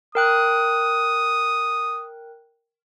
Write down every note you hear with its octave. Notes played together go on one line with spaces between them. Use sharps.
A#4 G5 D#6 F#6